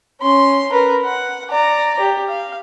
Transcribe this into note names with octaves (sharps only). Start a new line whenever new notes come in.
C#4 C6
A#4 B4
F#5
D5 A#5
G4
F5